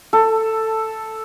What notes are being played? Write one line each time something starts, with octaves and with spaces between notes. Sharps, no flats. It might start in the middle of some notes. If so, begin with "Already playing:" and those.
A4